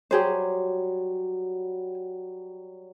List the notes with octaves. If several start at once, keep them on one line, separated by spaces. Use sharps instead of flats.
F#3 G3 G4 G#4 C5